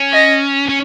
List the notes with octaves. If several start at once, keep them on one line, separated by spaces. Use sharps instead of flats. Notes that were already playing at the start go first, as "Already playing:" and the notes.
Already playing: C#4
D#5
C#4